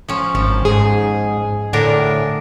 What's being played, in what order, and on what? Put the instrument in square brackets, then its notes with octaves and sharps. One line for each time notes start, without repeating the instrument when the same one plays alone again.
[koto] F3 C#4
[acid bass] G#1 [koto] F3
[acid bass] G#2 [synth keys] G#4
[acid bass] A2 [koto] D3 D4 A#4